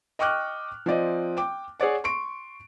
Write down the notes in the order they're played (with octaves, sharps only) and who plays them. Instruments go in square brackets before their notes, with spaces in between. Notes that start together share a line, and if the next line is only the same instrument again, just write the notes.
[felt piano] D#5 G5 C#6 D6 F6 F#6
F3 C4 D5 D#5
G5 D6
G#4 C#5 D5 F#5
C6 C#6 D7